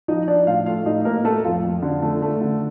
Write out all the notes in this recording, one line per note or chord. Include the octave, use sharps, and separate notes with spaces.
F3 D#4 D#5
F3 D4 D5
A2 F4 F5
A3 F4 F5
A2 D#4 D#5
A2 A#3 A#4
A3 A4
F2 F4
F2
D3
A3
A3
D3